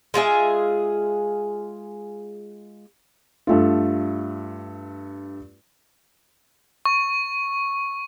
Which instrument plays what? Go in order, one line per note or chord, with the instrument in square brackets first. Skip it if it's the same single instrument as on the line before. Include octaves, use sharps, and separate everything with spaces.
[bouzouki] G#3 F4 G#4 E5
[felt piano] G2 A3 F4
[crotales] C#6